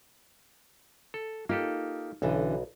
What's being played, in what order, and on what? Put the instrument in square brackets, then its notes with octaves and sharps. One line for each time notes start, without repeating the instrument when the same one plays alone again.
[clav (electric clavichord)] A4
[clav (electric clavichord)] A#3 G4 A4 [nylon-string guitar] D#4 F4
[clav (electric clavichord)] B1 [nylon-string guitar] D3 E3 C#4